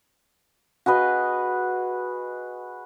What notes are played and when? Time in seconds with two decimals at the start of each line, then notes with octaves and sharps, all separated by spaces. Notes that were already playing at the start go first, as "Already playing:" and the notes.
0.86 F#4 G#4 B4 D#5